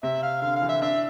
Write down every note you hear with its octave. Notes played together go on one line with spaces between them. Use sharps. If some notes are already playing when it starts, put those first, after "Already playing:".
C3 E5
F5
D3 F5
F5
E3
E5
D4 E5